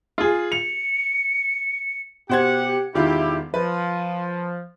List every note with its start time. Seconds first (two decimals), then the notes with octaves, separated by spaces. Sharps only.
0.18 F4 G#4
0.52 C#7 F7
2.29 B2 G4 C5 F#5 G#6
2.95 E1 D#3 E4 F4 G4
3.54 F3 B4